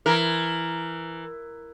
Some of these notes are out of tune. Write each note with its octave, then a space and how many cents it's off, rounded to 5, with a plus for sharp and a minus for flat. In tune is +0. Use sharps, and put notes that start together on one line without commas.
E3 +10 A#4 +0